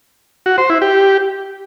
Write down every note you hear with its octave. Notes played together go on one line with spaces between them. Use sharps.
F#4
C5
E4
G4